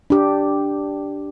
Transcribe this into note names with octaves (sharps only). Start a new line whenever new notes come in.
D4 G4